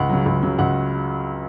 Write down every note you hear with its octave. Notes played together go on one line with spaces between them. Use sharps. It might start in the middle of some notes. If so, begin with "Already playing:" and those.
Already playing: C#2 F#5
C#3 F#3
C#2
C#3 F#3
C#2 F#5